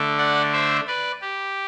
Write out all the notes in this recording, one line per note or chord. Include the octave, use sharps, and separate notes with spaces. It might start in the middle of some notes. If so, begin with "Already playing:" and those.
Already playing: D3 A3 D4
D5 F#5
C5 E5
B4 D5
G4